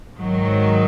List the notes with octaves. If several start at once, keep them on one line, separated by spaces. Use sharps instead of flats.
G#2 D#3 F#3